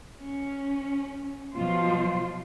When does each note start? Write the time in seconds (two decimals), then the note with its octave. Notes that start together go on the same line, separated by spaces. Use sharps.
0.20 C#4
1.56 B2 F3 F#3 F4 C5